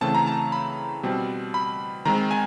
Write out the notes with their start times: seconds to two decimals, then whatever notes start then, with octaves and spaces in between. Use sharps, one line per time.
0.01 C#3 E3 A3 C4 A5
0.15 A#5
0.27 A5
0.52 B5
1.03 B2 G3 C4
1.54 B5
2.05 D#3 G#3 C4 A#5
2.31 G#5